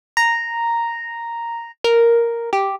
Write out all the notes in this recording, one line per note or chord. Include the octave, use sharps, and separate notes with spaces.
A#5
A#4
G4